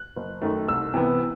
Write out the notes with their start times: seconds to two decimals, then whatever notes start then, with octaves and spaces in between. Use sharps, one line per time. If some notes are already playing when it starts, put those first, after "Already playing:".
Already playing: F#6
0.16 F#1
0.42 F#2 D#3 A3
0.68 C2 E6
0.94 C3 E3 B3